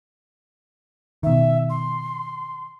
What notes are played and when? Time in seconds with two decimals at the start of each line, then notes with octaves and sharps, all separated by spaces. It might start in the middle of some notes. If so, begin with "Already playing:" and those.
1.23 B2 D#3 E5
1.69 C6